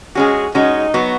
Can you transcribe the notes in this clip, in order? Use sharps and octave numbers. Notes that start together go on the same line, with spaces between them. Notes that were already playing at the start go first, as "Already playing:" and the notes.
G#3 C#4 F#4 G#4
G#3 C#4 D#4 F#4
F#3 B3 F#4